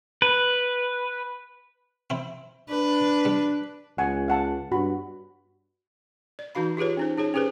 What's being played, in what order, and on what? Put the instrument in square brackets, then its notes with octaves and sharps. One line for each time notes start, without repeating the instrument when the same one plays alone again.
[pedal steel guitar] B4
[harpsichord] C4 E4
[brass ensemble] D4 [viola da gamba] B4
[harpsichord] G3
[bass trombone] C#2 [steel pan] F#5 G#5
[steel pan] F5 F#5 A5
[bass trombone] G2 [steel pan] F#4 B5
[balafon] D5
E3 D#4 F#4 F5 B5
F4 G4 G#4 B4 C#5
C#4 D#4 C5
D#4 G#4 C#5 A5
C#4 G4 G#4 B4 C5